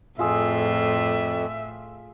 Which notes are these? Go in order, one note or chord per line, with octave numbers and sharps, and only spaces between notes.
F2 A2 F4 G#4 E5 E6